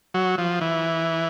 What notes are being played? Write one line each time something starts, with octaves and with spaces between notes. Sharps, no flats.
F#3
F3
E3